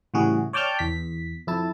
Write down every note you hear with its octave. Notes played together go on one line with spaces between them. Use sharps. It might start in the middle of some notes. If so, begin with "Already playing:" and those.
A2 C#3 E3 G3 F#4 G#4
C#5 D5 G5 A5 F6 G6
E2 B6
F2 E4 A5